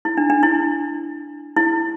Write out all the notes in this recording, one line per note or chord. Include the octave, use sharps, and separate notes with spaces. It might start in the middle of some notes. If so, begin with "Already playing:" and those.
E4
D4
D4
E4
E4